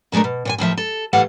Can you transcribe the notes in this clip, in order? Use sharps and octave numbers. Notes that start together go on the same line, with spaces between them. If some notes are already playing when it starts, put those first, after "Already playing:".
A#2 G#3 A3 D4 A#4
B2
A#2 C#5 G#5
D#2 A2 F3 E5
A4
A2 E3 G3 A4 F5 F#5